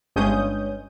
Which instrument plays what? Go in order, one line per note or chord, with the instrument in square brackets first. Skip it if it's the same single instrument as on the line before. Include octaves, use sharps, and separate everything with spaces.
[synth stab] G1 G2 G#3 C#4 D#6 G6